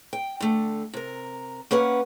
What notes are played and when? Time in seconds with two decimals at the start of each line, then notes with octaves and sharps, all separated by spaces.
0.13 G5
0.40 D3 A3
0.93 C3 A#4
1.71 A#3 C#4 B4 F#5